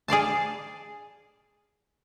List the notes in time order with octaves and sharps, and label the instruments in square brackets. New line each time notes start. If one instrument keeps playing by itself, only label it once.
[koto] G#4 D5 F5 A5